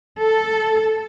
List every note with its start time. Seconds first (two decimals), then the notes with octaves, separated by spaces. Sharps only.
0.20 A4